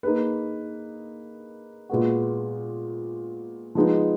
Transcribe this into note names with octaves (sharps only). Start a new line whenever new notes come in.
A#3 D#4 G#4 B4
A#2 G#3 B3 F#4
F3 G#3 B3 D#4